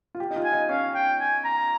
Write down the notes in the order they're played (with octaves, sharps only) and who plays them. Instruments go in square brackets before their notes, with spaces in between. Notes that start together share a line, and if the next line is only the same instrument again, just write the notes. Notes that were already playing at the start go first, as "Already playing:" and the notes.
[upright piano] F4
G4
D#4
F4
[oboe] G#5
[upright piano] D#4
[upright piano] C#4 [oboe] F5
[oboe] G5
G#5
A#5